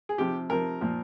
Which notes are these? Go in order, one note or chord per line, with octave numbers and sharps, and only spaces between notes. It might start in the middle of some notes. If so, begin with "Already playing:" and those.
G#4
C3 F3 G4
C3 F3 A#4
A#2 F3